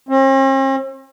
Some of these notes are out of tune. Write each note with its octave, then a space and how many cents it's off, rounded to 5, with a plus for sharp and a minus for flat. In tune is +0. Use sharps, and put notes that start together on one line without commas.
C4 +45